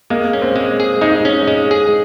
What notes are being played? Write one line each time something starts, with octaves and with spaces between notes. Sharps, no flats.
G#3 A#3
C#4
C4
G#3
G#4
G#3 D#4
C#4
G#3
G#4